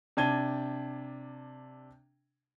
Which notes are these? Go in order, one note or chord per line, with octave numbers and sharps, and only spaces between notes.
C3 D4 A5 G#6 D#7 G7